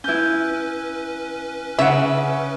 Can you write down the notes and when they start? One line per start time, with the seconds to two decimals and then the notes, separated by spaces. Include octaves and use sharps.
0.04 C#4 E4 B4 G6
1.79 C#3 E5 F#5